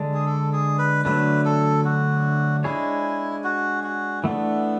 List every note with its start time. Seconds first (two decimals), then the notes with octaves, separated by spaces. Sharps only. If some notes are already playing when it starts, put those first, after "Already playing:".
Already playing: D3 G#3 D4
0.14 G#4
0.26 A4
0.53 G#4
0.79 B4
1.05 D3 F#3 A3 D4 B4
1.45 A4
1.85 F#4
2.64 G#3 D4 E4 G#4 C#5
3.44 F#4
3.84 F#4
4.24 E3 A3 B3 D4